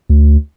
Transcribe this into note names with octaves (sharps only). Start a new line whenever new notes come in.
D2